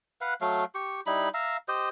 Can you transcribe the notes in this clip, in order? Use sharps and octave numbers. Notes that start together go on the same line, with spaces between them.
B4 F5 F#5
F#3 A3 F5
G4 C#6
G3 D#4 E4 B5
E5 F5 A#5
G4 C5 D#5